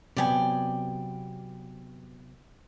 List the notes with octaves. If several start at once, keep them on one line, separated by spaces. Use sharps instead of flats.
C3 F#3 B3 D5 G5 G#5